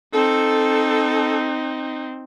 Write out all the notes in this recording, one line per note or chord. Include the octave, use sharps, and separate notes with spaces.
C4 D#4 A4